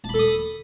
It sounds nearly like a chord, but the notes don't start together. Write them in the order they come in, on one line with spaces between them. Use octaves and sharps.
A5 B5 A4 D#6